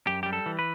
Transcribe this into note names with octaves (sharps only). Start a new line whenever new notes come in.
F#2 G4
G3 G4
A4
E3
B4